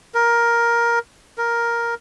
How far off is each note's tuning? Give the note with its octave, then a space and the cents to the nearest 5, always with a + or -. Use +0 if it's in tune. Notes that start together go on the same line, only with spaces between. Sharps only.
A#4 +10
A#4 +5